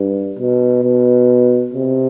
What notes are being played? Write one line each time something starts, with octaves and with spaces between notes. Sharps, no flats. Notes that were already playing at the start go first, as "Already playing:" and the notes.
Already playing: G2
B2
B2
C3